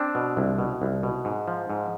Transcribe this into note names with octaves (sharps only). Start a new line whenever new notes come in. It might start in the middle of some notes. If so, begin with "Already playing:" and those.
Already playing: C4 D4
B2
C2
B2
C2
B2
G#2
F3
G#2